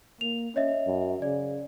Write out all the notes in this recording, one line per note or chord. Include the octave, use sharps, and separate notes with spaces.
A#3 F7
C#4 C#5 D#5 E5
F#2
C#3 D5